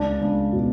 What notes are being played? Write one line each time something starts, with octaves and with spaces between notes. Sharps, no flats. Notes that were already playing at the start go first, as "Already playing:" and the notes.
Already playing: C#2 D4
C#2
B2